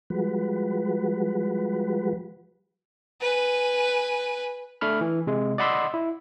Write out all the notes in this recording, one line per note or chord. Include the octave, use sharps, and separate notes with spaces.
F3 G3 G#3 F#4 B4
B4 G#5
A3 D4 B5 F6
E3
C3 G#3
D5 D#5 F#5 B5 C6 E6
E4